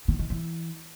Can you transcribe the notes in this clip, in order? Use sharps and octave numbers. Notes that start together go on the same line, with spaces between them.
D#3
D#3
E3